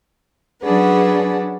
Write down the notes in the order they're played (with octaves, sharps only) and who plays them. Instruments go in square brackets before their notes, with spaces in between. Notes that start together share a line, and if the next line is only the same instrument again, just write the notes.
[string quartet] F#3 C#4 D4 G#4 B4 F#5